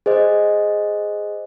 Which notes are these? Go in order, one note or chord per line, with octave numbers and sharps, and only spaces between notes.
G#4 C5 D#5